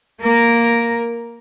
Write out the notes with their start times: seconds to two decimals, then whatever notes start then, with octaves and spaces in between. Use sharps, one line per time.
0.21 A#3 A#4